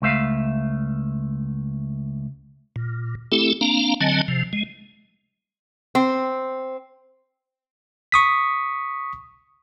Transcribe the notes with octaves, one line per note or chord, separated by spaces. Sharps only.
C#2 A3 E5 F5
A#2
A3 C4 E4 G4 A4
A#3 C4 D4 F5 A#5
D3 F#3 C4 D#5 G#5 A5
C3 F3
G#3
C4
C#6 D#6 B6